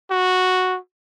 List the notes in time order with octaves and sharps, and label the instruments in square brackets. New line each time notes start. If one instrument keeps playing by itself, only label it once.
[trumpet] F#4